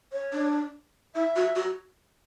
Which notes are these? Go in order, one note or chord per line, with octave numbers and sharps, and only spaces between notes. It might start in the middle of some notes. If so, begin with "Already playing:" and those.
C#5
D4
E4 E5
F#4
F#4